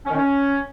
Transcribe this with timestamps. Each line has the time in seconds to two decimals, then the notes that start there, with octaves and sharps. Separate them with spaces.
0.05 C#4
0.10 D#3
0.15 C#4